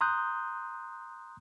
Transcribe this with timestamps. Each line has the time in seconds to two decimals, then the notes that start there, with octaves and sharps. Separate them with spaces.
0.01 A#5 C6 D#6 F#6 G6